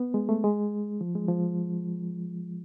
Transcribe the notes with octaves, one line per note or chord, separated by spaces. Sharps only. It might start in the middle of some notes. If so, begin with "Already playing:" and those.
Already playing: B3
G#3
A3
G#3
F3
G#3
F3